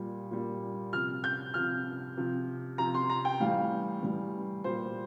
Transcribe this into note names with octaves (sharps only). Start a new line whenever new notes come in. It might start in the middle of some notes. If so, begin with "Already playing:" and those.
Already playing: A#2 G3
A#2 G3
C3 F3 F6
G6
C3 F3 F6
C3 F3
C3 F3 A#5
C6
A#5
G5
A2 E3 G3 F5
A2 E3 G3
A#2 G3 C5